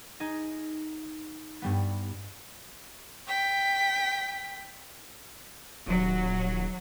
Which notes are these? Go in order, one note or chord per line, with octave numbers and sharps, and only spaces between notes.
D#4 G#4 D#5
G2 G3 B3
G5 B6
D#1 F#3